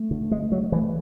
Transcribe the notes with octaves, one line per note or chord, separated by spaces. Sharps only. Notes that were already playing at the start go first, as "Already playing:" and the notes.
Already playing: A3
D3
G#3
F#3
E3 A3